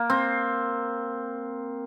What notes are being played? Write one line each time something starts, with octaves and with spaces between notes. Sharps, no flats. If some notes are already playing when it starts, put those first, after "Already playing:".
Already playing: A#3
C4